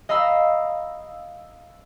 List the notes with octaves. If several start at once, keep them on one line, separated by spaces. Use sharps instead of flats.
D#5 F5 A#5 B5 E6